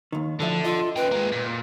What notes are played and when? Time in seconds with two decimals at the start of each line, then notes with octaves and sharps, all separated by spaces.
0.12 D#2 D#3
0.40 D2 D3 F3 E5
0.64 F4 D#5
0.96 C#4 B4 G5
1.12 G#3 A#3
1.32 A#2